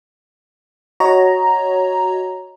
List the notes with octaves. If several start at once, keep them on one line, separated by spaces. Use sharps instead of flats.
F#4 C#5 D#5 A#5